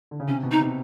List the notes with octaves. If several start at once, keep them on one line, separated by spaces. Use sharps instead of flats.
D3
C#3
C3 C#4
B2
D#4
C3